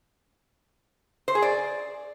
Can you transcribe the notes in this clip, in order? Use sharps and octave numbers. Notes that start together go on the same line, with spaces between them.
C5
G#4
D5